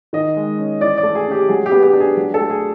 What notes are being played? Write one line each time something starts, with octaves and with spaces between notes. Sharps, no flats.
D#3 D#5
G#3
C#4
E3 D5
D5
A3
G#4
C#4 G4
F#3 G#4
G4
B3
G4
D4
G#4
F#3
A4
A3
G#4